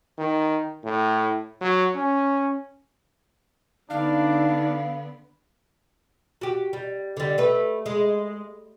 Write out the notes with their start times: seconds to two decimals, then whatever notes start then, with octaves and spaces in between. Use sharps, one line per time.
0.18 D#3
0.84 A2
1.61 F#3
1.95 C#4
3.90 D3 B3 D4 D#4 F5
6.41 F#4 G4
6.73 G3
7.17 D3 G3
7.38 A3 B4
7.86 G#3